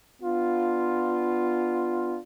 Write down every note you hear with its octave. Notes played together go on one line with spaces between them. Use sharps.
B3 D4 F4